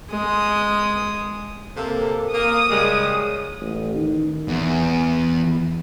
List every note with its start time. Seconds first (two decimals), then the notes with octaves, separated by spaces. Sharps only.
0.11 G#3 D#6
1.76 C3 A#3 A4
2.34 A#3 D#6
2.70 C#3 G3 G#3
3.61 A1
3.96 D#3
4.48 E2